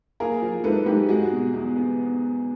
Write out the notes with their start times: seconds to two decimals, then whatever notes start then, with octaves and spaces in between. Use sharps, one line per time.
0.20 A#3 G#4 A#4
0.42 F3
0.64 G#2 A4 B4
0.86 G#2 G4 A4
1.09 G#3 F#4 G#4
1.32 B2
1.54 E2
1.76 B3